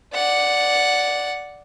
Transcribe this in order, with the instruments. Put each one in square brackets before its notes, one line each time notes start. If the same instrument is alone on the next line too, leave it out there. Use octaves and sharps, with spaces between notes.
[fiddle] D5 F#5